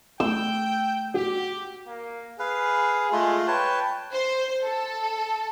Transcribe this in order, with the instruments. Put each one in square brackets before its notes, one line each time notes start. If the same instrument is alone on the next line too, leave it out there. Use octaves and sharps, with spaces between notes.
[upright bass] A3 [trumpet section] G5 [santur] E6
[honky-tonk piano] F#4 [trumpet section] G4
[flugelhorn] A#3
[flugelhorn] G#4 [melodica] B4 F5
[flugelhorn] G#3 [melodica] A3 F4
[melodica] B4 C#5 A5 [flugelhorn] G5
[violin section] C5
A4